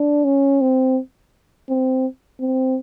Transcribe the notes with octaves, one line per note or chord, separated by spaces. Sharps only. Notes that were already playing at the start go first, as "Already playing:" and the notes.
Already playing: D4
C#4
C4
C4
C4